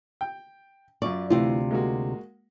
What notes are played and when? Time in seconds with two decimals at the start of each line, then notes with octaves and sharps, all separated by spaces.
0.21 G5
1.02 F#2 F4 D5 C#6
1.30 D2 C3 E3 E4 F4
1.71 G#3 A#3 F#4